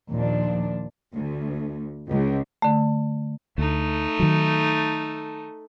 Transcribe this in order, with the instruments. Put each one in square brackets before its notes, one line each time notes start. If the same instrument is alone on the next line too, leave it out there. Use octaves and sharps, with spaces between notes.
[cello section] D#2 A#2 F3 D4
[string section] D2
C#2
[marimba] D3 A3
[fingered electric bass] D2 [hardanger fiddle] A3 D#4
[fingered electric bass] D#3 F#3